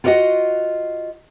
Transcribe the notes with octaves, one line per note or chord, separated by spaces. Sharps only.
F4 F#4 A#4 D5 D#5 F#5